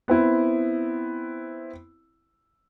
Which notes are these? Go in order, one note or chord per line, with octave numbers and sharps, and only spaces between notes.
B3 C4 E4